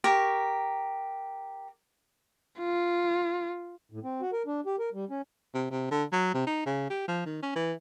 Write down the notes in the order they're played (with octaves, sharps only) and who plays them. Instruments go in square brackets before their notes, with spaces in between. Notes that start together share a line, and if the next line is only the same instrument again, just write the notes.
[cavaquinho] G4 A#4 C#6
[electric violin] F4
[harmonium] A2
C4
F#4
A#4
D4
G4
A#4
G3
C#4
[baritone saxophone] C3
C3
D3
F#3
C3
D#4
C#3
G4
F3
D#3
C#4
E3